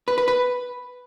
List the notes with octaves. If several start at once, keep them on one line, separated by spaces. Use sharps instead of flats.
B4
B4
B4